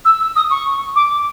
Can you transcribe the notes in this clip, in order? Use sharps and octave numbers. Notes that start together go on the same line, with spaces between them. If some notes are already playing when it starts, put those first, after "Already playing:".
E6
E6
D#6
C#6
D6